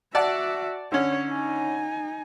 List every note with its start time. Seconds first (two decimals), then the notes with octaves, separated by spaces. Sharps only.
0.15 F#4 D5 E5 F#5 A5
0.92 D3 C#4 C#5
1.29 D#4 G#5